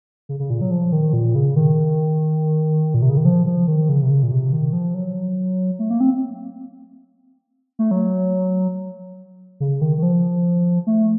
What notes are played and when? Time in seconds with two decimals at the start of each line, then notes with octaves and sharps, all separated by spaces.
0.29 C#3
0.40 C#3
0.50 A#2
0.61 F#3
0.71 F3
0.92 D#3
1.13 A#2
1.35 C#3
1.56 D#3
2.94 A#2
3.02 C3
3.10 C#3
3.17 D#3
3.25 F3
3.46 F3
3.67 D#3
3.89 C#3
4.03 C3
4.10 C#3
4.23 A#2
4.32 C3
4.52 D#3
4.73 F3
4.95 F#3
5.79 A3
5.90 A#3
6.00 C4
7.79 A3
7.91 F#3
9.60 C#3
9.81 D#3
9.98 D#3
10.03 F3
10.87 A3